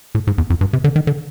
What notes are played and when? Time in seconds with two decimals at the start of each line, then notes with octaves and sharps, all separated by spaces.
0.15 A2
0.27 G#2
0.38 E2
0.50 F2
0.61 G2
0.73 C3
0.84 D3
0.96 D#3
1.07 D3